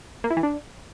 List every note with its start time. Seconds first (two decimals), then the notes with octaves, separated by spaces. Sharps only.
0.24 A#3
0.30 E4
0.37 E3
0.43 D4